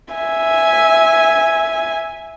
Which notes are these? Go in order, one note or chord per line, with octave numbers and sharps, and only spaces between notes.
E5 G#5